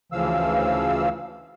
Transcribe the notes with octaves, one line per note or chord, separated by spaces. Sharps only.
D2 C#3 E3 F3 F5 E6